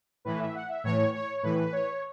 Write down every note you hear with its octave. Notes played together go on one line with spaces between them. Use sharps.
A2 E3 B4
E5
F#5
E5
A2 E3 C#5
C#5
A2 E3 B4
C#5